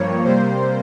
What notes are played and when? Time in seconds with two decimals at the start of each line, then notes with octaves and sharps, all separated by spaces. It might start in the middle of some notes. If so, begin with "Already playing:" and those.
Already playing: G2 F3 A#3 C#5
0.24 C3 G3 A#3 C5